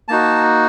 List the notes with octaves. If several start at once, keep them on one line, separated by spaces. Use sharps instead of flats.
A#3 D#4 F#4 A5